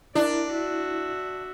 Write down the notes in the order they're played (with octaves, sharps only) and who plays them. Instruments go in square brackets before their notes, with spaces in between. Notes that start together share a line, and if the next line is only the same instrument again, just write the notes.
[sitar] D4 [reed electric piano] E4 [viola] A#4 D5
[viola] F#4 E5